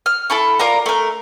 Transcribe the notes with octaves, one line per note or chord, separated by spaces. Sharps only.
F6
E4 A4 B5 C#6
F4 A#4 D5 A#5
A3 A#4